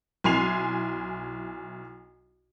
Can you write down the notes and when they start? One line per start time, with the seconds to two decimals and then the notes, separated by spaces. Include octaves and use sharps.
0.24 B1 E4 G#5 C6 C7 F7